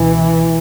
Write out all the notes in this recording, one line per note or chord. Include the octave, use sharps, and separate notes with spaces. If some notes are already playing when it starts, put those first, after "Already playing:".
Already playing: C#2 B2 E3